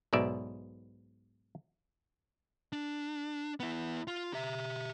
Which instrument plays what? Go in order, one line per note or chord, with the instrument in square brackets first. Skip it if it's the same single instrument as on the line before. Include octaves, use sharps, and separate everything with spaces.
[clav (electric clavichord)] B1 G#2 B2 D5 E5
[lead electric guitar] D4
B3 E4
F4
G4 E5